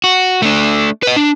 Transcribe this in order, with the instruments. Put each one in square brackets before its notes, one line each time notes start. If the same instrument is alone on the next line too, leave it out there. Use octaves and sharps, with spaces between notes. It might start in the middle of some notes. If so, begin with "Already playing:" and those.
[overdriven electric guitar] F#4
A3 D4
B4 D#5
D4